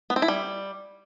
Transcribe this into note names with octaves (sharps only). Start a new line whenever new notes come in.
B3
C4
E4
G3